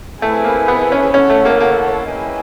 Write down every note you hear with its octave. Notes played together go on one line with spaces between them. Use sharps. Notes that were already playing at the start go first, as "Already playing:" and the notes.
A3 C4 E4 G#4 B4
A#3
B3
C#4
C#4 E4 A4 C#5 F#5 A5
A3
A#3
A#3
E4 G#4 B4 D#5 G5